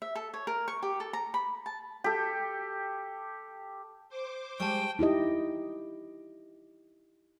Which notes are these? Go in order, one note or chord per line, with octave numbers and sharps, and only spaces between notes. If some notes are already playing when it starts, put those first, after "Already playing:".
E5
A4
C#5
A#4
C#6
G4
A4
A#5
B5
A5
G4 A4
C5 D6
G3 G#3 G5 A5 C#6
D#4 E4 G4 D#5